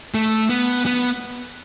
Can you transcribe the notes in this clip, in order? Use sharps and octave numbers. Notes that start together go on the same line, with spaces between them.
A3
B3
B3